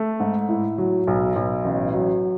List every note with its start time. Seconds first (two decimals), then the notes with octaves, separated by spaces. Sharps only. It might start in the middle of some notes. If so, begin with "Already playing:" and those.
Already playing: A3
0.20 G#2
0.49 A2
0.78 F#3
1.07 B1
1.36 B1
1.65 A1
1.94 F#3